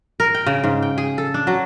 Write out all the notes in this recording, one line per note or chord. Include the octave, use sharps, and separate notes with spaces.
A#4
G5
C#3
G#2
G5
G#4
A4
D4
F#3